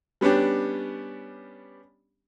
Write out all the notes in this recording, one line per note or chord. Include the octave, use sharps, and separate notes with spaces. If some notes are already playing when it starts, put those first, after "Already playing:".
G3 B3 C#4 D4 G4